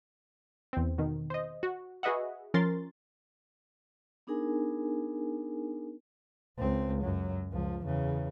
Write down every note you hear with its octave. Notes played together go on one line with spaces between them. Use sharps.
E2 C4
B2 D#3
C5 D#5
F#4
F#4 G#4 B4 D#5 E5 F#5
F3 C#4 A#4 C6 A6
B3 D4 D#4 G#4 A#4 G#5
C#2 C4
F#2 F#3
C#2 F3
E2 C#3